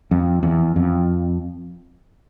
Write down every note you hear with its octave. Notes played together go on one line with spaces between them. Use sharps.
F2
E2
F2